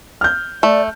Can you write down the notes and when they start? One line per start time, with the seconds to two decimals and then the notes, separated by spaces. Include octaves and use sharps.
0.21 F6 G6
0.63 A3 D5